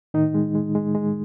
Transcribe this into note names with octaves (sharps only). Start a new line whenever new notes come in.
A2 D#3 D#4
G#3
G#3
G#3
G#3